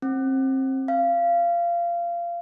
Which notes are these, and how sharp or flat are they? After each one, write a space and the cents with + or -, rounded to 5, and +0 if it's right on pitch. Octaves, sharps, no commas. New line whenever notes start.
C4 +25
F5 -20